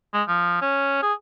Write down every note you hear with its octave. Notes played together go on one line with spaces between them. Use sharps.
G#3
F3
C#4
G#4